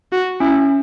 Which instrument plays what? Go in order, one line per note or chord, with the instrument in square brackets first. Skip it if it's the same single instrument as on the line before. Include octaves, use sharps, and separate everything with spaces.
[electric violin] F#4
[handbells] C#4 [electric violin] E4